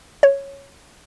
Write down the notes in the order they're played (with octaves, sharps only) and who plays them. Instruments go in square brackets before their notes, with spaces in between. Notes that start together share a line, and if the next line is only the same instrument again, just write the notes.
[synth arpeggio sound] C#5